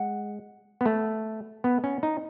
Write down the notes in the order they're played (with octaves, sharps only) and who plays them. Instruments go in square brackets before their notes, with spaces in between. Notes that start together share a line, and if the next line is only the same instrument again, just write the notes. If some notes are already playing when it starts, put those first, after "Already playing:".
Already playing: [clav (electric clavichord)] G#3 [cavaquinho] F#5
[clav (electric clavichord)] B3
A3
B3
C#4
D#4